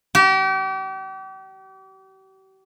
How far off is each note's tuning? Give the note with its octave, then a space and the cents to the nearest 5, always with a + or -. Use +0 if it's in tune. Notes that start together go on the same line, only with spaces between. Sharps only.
G4 -40